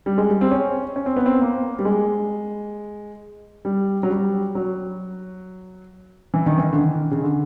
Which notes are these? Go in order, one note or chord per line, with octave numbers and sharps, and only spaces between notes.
G3
G#3
G3
C4
C#4
C#4
C4
B3
C4
A#3
G3
G#3
G3
F#3
G3
F#3
E3
D#3
E3
D3
D#3
C#3
D3